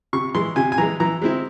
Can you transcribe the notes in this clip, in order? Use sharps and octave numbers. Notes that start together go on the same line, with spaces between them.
C3 C#6
E3 G#3 C6
C3 G#5
G#5
E3 G#3 A#5
E3 A#5
G#3 C4 E4